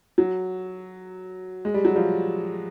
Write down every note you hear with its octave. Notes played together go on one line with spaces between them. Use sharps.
F#3
G#3
G3
F#3
F3 G3